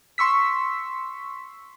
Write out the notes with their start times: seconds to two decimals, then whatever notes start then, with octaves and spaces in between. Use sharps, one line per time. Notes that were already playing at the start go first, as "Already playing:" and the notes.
0.18 C6 C#6 E6 B6